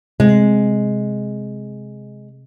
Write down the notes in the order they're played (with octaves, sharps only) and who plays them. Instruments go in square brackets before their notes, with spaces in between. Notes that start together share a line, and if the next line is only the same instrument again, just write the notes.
[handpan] C3 [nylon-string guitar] G#3